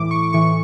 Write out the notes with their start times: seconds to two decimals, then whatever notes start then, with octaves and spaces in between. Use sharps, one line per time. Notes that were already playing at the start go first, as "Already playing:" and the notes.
Already playing: A2 E3 D6
0.11 C#6
0.33 A2 E3 C#6